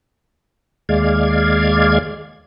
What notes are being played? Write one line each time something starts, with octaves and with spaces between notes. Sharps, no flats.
D#2 G#3 D5 F5 G#6